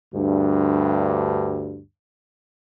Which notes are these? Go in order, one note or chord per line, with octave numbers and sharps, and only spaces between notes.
D2 G2